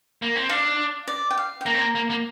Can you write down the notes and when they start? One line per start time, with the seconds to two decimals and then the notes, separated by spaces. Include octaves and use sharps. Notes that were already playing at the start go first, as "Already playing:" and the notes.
0.22 A#3
0.36 C4
0.49 D4 F5
1.08 D5
1.31 G5
1.37 F5
1.61 G5
1.66 A#3 A#5
1.74 C4
1.81 A#3
1.95 A#3
2.10 A#3